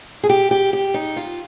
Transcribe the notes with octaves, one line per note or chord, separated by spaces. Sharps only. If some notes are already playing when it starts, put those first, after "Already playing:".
G#4
G4
G4
G4
D#4
F4